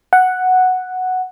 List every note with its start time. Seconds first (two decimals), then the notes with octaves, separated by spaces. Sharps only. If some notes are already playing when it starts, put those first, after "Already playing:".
0.13 F#5